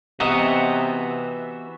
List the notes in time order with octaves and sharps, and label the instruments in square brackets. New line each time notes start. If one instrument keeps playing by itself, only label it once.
[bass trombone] C3 [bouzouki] E3 B3 [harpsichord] D#4 [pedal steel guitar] F#4 E5